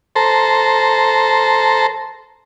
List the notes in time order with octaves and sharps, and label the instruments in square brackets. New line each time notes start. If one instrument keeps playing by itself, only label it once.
[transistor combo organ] A4 C5 A#5